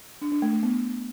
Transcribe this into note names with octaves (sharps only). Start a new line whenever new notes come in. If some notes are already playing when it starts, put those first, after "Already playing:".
D4
D4
A3
A3
B3